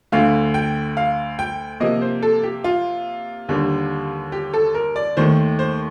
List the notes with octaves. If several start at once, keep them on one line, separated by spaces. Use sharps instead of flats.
D2 D3 A3 F5
G5
F5
G5
C3 F3 A#3 D#5
C5
A4
G4
F4
D#2 D3 G3
G4
A4
A#4
D5
D#2 D#3 A3 C5
C5